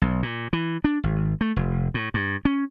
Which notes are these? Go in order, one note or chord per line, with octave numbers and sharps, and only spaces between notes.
B1
A#2
E3
D4
G#1
A3
F1
A2
G2
C#4